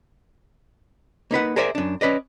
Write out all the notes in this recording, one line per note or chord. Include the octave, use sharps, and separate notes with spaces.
A#3 D#4 B4 F#5
G#4 A#4 C5 D5 E5 G#5
F#2 D4
C#4 B4 D5 D#5